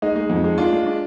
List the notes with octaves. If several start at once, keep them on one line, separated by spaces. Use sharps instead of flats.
G#3 D#4
G#3
F2
G#3
D4 F4
G#3
D4